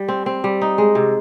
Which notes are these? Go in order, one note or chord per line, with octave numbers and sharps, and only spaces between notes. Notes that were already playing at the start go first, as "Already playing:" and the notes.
Already playing: G3
C4
C4
G3
D#4
G#3
C3